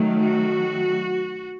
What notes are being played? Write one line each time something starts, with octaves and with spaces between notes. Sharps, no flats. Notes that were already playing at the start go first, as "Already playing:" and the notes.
Already playing: D#3 F#3 A3
F#4